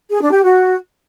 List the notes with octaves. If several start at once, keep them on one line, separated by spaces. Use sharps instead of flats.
G#4
D4
G4
F#4